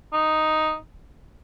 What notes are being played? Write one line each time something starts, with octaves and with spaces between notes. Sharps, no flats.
D#4